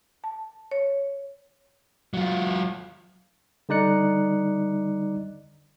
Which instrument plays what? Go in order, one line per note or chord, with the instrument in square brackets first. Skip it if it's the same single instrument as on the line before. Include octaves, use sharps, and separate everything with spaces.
[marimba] A5
C#5
[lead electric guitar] F#3 F4
[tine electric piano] D3 G3 D#4 D5 F#6 C#7